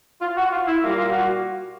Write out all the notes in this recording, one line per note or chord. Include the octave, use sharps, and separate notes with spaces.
F4
F#4
F4
E4
A#2 G3 A#3 F4
F4
F#4